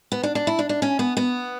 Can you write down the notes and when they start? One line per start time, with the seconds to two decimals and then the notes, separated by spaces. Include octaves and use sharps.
0.12 B3
0.23 D4
0.35 D4
0.47 E4
0.59 D4
0.69 D4
0.82 C#4
0.99 B3
1.17 B3